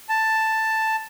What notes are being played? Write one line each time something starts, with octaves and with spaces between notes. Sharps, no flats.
A5